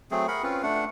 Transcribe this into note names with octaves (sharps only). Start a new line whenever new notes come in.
F#3 A3 C4 G#4
G#4 A#4 F#5 B5
C4 C#4 F4 B4
A3 D4 F#5